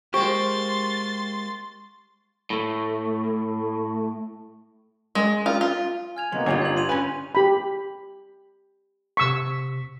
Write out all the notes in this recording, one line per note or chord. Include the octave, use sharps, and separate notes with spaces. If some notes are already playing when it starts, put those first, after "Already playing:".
G#3 A#3 G4 C5 C6 C#6 A6
A2 A3
G#3
F4
F4
G#5 F6 G#6 F7
C3 F#3 A#3 B3 D#4 C6
G1 F4 G4 C#5
G2 G6 F#7
C6 D#7 F7
C#4 B4 G#5
G4 B5
C3 C#6 E6 B6